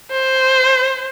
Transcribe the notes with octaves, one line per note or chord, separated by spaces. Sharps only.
C5